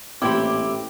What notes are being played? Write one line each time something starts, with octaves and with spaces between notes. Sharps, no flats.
A1 A#2 C4 E4 G4 G5 D6